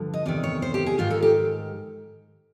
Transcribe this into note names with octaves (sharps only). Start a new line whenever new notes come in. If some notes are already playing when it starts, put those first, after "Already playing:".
Already playing: G2 D3 F3
D#5
E2 C3 D#3 D5
C#5
C5
G4
G#4
G#2 D#3 F4
A4
G4